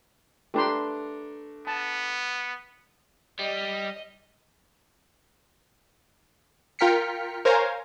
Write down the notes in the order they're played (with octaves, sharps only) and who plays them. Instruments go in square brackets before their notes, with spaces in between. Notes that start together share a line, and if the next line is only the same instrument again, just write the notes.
[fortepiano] A3 D4 A#5 [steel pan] G4 B4 C6
[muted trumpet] B3 [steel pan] A5
[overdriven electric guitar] G3 [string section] D#5
[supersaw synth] F4 A#4 G5 F6 B6 C#7
A#4 C5 C#5 F5 G#5 A#5